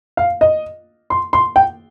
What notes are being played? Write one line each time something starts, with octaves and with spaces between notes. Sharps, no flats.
F5
D#5
C6
C6
G5